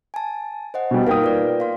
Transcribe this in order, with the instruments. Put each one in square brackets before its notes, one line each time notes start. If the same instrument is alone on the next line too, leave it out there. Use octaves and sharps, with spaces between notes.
[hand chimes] G#5 A5
C5 D#5 F#5
[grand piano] B2 G3
[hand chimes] A#3 D#4 F5 [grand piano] A#4 G5 D#6
[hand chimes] F4 B4 D5
F5 C6